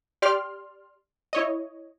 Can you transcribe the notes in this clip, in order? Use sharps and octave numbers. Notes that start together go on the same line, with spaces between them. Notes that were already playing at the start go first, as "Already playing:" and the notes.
G4 D5 C6 F6
E4 C#5 D#5